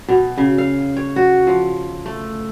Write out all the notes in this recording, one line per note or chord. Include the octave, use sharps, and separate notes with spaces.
B2
C#3
F5
C#5
F#4
F3
A3